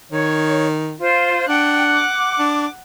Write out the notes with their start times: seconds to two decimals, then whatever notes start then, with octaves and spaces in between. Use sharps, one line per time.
0.12 D#3 C#5
0.99 F4 C5
1.48 D4 F#5 G5
1.93 D6
2.39 D4